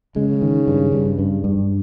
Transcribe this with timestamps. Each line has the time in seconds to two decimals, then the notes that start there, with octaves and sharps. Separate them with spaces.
0.16 C#3 G#3
0.42 D#3
0.67 G2
0.93 G2
1.19 G2
1.44 G2